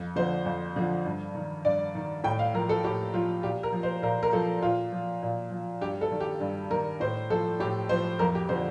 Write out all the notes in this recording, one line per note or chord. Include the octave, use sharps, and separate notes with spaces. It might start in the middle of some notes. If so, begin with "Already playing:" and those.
Already playing: F2
D3 F3 C5
F2
D3 F3
G2
D#3
G2 D5
D#3
A2 G5
F5
F3 A#4
A4
A2 G4
F3 F4
A#2 G4
A#4
F3
C5
A#2 A#4
A#4
F3 A4
A#2 F4
F3
A#2
F3
G2 G4
A4
D#3
G4
G2
D#3 A#4
A2 C5
F3 A4
A2 G4
F3 C5
F2 A#4
G4
D3 F3 C5